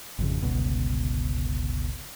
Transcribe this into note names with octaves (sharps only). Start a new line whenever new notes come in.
G#1 F2 C#3
G1 C#2 B2